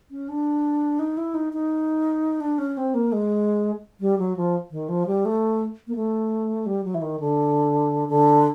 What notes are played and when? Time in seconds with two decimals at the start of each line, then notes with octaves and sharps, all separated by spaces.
0.11 C#4
0.29 D4
0.99 D#4
1.17 E4
1.34 D#4
1.53 D#4
2.41 D4
2.58 C#4
2.77 C4
2.94 A#3
3.12 G#3
4.00 G3
4.18 F#3
4.37 F3
4.71 D#3
4.89 F3
5.07 G3
5.25 A3
5.87 A#3
5.95 A3
6.66 G3
6.84 F#3
6.94 E3
7.02 D#3
7.20 D3
8.08 D3